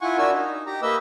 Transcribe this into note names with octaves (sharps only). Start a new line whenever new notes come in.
E4 F4 F#5 G#5 C#6
D4 E4 F#4 A#4 G#5 E6
D#4
G4 A#5
A#3 B4 D#5 E5 E6